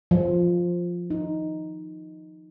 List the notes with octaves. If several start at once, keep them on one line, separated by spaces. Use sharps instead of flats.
F3
D#4